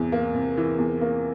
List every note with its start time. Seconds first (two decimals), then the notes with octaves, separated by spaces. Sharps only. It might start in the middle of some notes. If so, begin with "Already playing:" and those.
Already playing: E2 C3 E3
0.12 A#3
0.34 C3
0.57 E3
0.78 E2
1.01 A#3